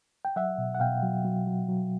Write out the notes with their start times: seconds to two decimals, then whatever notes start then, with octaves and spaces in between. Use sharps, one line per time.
0.25 G5
0.36 F#3 E5 F#5
0.58 B2
0.75 F#5
0.80 B2 F5 G5
1.03 F#3
1.25 F#3
1.47 F#3
1.68 F#3